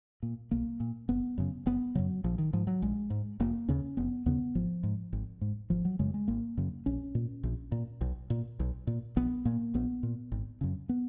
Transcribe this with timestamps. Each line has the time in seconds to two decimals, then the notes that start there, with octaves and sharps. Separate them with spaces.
0.23 A#2
0.51 B1 A#3
0.80 A#2
1.09 F#1 B3
1.38 F#2 C#3
1.66 F#1 B3
1.95 F#2 C#3 F#3
2.24 A#1 F3
2.38 D#3
2.53 G#2 F3
2.67 F#3
2.82 A#1 G#3
3.10 G#2
3.40 F1 A#3
3.69 D#2 C#3 C#4
3.97 F1 B3
4.26 D#2 C#3 B3
4.55 G#1 F3
4.83 G#2
5.13 G#1
5.41 G#2
5.70 G#1 F3
5.85 F#3
5.99 F#2 C#3 G#3
6.14 G#3
6.28 G#1 A#3
6.57 F#2 C#3
6.86 A#1 C#4
7.15 A#2
7.43 A#1
7.72 A#2
8.01 B1
8.30 A#2
8.60 B1
8.87 A#2
9.16 A#1 B3
9.45 A#2 A#3
9.74 A#1 B3
10.03 A#2
10.32 G#1
10.61 F#2 C#3
10.89 B3